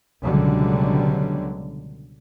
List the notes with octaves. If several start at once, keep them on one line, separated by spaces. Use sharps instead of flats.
C#2 B2 D3 F#3 G3